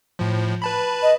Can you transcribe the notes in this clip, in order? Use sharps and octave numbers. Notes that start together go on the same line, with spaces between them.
A2 F3
B4 A5 B5
D#5